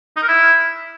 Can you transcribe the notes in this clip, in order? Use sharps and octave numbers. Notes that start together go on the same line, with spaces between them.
D#4
A#4
E4